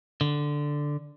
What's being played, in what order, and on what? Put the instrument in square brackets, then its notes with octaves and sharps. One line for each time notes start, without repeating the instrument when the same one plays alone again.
[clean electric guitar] D3